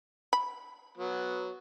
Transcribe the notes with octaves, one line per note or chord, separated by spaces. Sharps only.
B5
F#3 B3